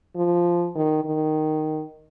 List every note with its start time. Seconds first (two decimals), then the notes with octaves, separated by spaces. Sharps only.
0.16 F3
0.76 D#3
1.05 D#3